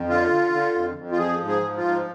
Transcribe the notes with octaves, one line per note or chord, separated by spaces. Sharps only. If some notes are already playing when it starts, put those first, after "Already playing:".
Already playing: F2
D3 F4
D3
D3
F2
F2
F4
F3 G#4
G#2
G#4
F3
F4
G#2